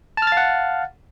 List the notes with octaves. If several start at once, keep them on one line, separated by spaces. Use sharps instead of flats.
F5 F#5 A5 F6 A6